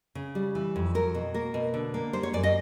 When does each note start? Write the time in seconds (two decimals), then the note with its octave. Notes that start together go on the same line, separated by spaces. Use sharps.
0.15 C#3
0.35 G3
0.55 E3
0.76 F2
0.95 F#3 A#4
1.15 B2
1.34 A#3 A#4
1.54 B2
1.74 D3
1.94 A#3
2.13 G3 C5
2.23 C#5
2.33 F#2 D5
2.43 D#5